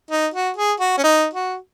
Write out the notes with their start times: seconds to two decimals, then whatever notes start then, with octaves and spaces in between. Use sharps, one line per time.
0.11 D#4
0.34 F#4
0.57 G#4
0.80 F#4
0.98 C#4
1.04 D#4
1.34 F#4